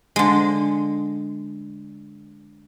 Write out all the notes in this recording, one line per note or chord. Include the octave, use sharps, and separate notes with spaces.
D3 G#3